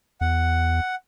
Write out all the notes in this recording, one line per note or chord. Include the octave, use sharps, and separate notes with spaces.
E2 F#5